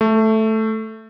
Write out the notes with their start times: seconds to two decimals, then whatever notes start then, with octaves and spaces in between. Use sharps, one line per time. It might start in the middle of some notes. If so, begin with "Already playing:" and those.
0.01 A3